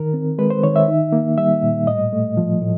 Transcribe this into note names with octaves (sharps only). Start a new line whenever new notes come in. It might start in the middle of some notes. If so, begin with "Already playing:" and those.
Already playing: D#3 A#4
C4
G#3 B4
C5
D#3 C#5
E5
D#4
A#3
G3 E5
A#2
A2 D#5
A3
F3
A2